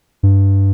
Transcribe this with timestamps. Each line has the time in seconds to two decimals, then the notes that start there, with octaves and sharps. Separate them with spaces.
0.23 G2